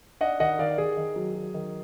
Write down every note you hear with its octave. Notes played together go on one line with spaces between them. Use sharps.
D4 D#5 F#5
D#3 D#5 F#5
D#3 D5 F5
D#3 G#4
D#3
F#3
F#3
D#3